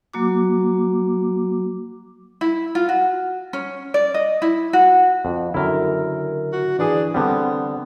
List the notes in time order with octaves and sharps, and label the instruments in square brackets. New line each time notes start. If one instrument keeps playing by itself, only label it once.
[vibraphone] F#3 A#3 F#4 D6
[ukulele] E4
F4
F#4
C#4
D5
D#5
E4
F#4
[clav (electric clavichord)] F2
[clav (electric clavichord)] F#2 E4 [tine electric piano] D3 A#4
[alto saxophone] F#4
[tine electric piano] E3 G#4 [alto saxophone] D4
[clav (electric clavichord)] D3 G3 [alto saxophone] B3 [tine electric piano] C4